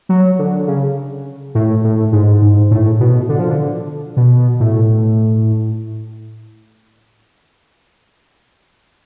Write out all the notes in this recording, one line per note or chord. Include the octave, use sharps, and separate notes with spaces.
F#3
D3
C#3
A2
A2
G#2
G#2
A2
B2
D3
F3
D3
B2
A2